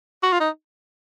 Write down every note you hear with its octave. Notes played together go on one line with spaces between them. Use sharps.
F#4
F4
D#4